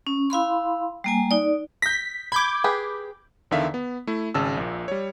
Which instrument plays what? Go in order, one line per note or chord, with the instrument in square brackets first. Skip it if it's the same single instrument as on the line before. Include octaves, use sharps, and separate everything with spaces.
[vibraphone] C#4
E4 F5 B5 C6
G3 A#3 G#5
D#4 D5
[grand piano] G6 A#6 [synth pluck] B6
[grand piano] B5 [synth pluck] D6 G6 G#6
[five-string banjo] G4 G#4 B4
[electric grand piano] E2 D3 D#3 E5 F5 B6
B3
A3 E4
G#1 C#3 A5 E6
A#1 A#2
G3 C#5